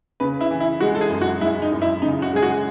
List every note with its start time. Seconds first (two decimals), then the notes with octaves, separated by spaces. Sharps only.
0.20 C#3 B4
0.41 E4
0.51 E3
0.60 E4
0.80 G#3 F#4
0.95 A4
1.01 G#4
1.10 F#2
1.21 F#4
1.41 G#3 E4
1.62 D#4
1.72 F#2
1.82 E4
2.02 C#3 D#4
2.22 F#4
2.33 G#3 G#4
2.43 F#4